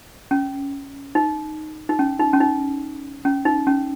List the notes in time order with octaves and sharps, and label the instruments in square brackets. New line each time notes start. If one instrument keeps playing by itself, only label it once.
[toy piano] C#4
D#4
D#4
C#4
D#4
C#4
D#4
C#4
D#4
C#4